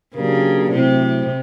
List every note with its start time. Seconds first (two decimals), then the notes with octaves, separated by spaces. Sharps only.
0.15 C#3 F#3 A#3 D4 G4 A#4
0.70 C3 F#3 A3 C4 E4